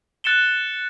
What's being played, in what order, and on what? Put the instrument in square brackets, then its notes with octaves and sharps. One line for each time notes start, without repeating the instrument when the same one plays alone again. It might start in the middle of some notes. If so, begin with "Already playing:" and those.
[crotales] F#6 A6 C#7 E7 G7